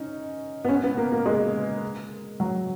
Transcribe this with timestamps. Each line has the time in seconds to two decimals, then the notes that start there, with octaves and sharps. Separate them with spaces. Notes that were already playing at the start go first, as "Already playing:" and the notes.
Already playing: C#4 D#4
0.65 B3
0.69 C#4
0.83 B3
0.97 A#3
1.12 A#3
1.26 G#3
2.40 F#3